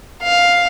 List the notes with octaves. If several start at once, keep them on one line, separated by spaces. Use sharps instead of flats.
F5